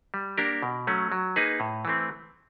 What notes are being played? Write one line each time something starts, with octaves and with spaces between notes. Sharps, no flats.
G3
A#3 D4 G4 A#4
B2
F#3 A3 C#4
F#3
A#3 D#4 G#4 B4
A2
E3 A3 C4